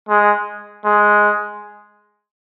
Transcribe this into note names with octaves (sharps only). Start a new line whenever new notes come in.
G#3
G#3